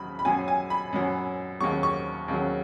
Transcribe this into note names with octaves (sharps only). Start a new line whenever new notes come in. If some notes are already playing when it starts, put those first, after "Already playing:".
Already playing: D#2 C#3 F#3 B5
B5
F#2 F#3 G#5
G#5
B5
F#2 F#3
D#2 C#3 F#3 C#6
C#6
D#2 C#3 F#3